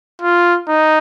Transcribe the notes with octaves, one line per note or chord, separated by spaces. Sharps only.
F4
D#4